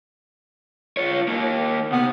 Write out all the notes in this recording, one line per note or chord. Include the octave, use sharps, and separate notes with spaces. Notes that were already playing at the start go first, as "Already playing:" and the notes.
F4 C#5
A#3 D#4
C3 B3